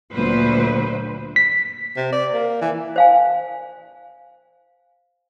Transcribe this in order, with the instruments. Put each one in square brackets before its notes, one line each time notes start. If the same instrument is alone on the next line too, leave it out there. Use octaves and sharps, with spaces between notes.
[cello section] D2 A#2 F#3 B4 C5
[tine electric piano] B6
[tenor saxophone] C3
D5
A#3
E3
[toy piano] C5 F5 G#5